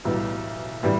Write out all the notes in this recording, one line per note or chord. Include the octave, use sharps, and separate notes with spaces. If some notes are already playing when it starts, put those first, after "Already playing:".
B1 A2 E3 G3 B3
A2 E3 G3